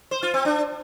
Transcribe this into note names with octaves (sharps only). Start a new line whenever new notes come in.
C5
F4
C4
D4